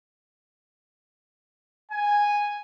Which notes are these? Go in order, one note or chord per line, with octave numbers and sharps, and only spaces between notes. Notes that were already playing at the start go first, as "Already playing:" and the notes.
G#5